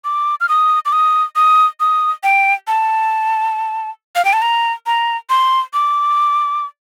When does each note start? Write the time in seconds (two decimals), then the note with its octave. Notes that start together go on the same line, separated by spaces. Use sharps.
0.05 D6
0.41 F6
0.49 D#6
0.86 D6
0.92 D#6
1.36 D#6
1.80 D#6
2.23 G5
2.67 A5
4.16 F5
4.25 G5
4.33 A5
4.42 A#5
4.86 A#5
5.30 C6
5.74 D6